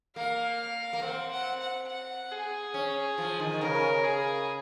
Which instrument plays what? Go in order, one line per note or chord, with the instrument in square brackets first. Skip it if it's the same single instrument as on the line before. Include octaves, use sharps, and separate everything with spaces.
[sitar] A#3 [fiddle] F5
[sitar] A#3
[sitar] C4 [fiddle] F#5
[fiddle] F#5
F#5
F#5
G#4
[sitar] C#4
F3
D#3
[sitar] C#3 [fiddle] A#4
[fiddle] G#4